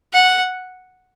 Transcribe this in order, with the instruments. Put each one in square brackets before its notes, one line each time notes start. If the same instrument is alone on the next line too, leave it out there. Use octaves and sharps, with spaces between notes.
[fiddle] F#5